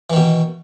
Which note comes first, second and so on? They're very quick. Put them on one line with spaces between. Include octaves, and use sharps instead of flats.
E3 D#3 B2